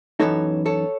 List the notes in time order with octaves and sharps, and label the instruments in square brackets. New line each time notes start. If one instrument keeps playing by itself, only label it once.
[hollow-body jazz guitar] F#2 E3 B3 D#4 A4 C#5
A4 C#5